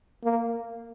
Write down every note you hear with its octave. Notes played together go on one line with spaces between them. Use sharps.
A#3